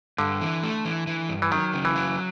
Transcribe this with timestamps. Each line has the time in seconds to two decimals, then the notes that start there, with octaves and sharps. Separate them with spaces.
0.18 G2 D3
0.41 E3
0.63 A3
0.85 E3
1.07 E3
1.29 G2
1.42 E3
1.51 D#3 F#3
1.74 C#3
1.85 E3
1.96 F#3